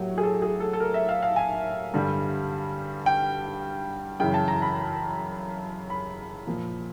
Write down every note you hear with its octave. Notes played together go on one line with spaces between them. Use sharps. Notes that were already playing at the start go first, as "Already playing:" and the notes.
Already playing: A2 F#3 A#3 G4
G#4
A4
G#4
A4
A4
A#4
E5
F5
F5
G#5
G2 D3 G3
G5
F#2 C#3 E3 G5
A5
A#5
B5
B5
A#2 F3 A#3